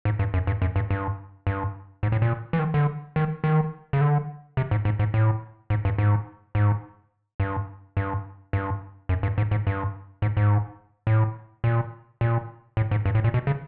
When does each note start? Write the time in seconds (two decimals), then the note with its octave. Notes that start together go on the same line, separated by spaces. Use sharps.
0.05 G#2
0.19 G2
0.34 F#2
0.47 G2
0.62 F#2
0.76 G2
0.90 G2
1.47 G2
2.03 G#2
2.12 A2
2.22 A#2
2.53 E3
2.59 D#3
2.74 D3
3.16 D#3
3.44 D#3
3.93 C#3
4.01 D3
4.57 C3
4.71 G#2
4.85 G#2
4.99 G#2
5.14 A2
5.70 G#2
5.85 G2
5.98 G#2
6.55 G#2
7.40 G2
7.97 G2
8.53 G2
9.09 F#2
9.23 G2
9.38 G#2
9.51 G#2
9.67 G2
10.22 G#2
10.37 G#2
11.07 A2
11.64 A#2
12.21 A#2
12.77 A2
12.91 G#2
13.06 G2
13.15 A2
13.24 A#2
13.34 B2
13.47 C#3